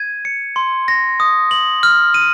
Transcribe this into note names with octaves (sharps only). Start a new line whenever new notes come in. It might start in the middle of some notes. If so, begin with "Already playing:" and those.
Already playing: G#6 D#7
C#7
C6
A#6
D#6
F#7
F6
D#7